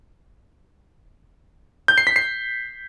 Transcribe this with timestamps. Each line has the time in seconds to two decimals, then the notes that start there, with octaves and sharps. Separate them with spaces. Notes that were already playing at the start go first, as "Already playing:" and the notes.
1.88 G6
1.98 C7
2.07 B6
2.16 C7